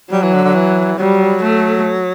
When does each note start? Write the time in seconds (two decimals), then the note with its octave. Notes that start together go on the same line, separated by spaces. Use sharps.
0.12 F#3 G3
0.23 E3
0.34 D3
0.45 D3
0.55 E3
0.98 F#3 G3
1.43 A3